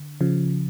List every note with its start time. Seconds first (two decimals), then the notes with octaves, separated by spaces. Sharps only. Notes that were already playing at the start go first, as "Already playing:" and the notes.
Already playing: D3
0.21 C#3 F3